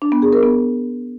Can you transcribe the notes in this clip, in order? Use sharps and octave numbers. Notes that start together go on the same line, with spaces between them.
D4
B3
G#4
A#4
B3